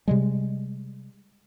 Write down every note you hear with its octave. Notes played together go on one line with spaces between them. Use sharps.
C3 G3 G#3